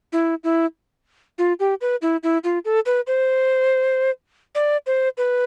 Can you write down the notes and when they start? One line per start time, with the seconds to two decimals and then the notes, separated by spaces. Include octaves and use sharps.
0.12 E4
0.44 E4
1.38 F4
1.60 G4
1.81 B4
2.02 E4
2.23 E4
2.44 F4
2.65 A4
2.86 B4
3.07 C5
4.55 D5
4.87 C5
5.18 B4